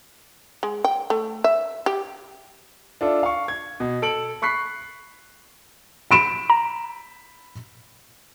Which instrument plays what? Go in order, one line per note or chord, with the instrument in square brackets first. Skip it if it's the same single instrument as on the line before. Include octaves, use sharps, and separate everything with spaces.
[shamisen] G#3
G5
A3
E5
G4
[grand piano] D4 F4 A4 E5
F5 C#6
G#6
B2
A4 D7 F#7
B5 C#6 F#6 B6 C7
[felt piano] B5 D7 E7
[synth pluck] A#5